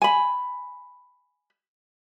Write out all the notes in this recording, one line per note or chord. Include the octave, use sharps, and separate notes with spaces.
G#5 B5